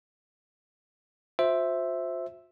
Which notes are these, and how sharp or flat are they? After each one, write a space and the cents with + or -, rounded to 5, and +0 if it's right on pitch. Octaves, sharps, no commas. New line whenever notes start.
F4 +45 C5 +0 E5 +0